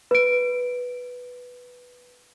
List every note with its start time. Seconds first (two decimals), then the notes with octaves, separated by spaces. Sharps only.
0.11 B4 D7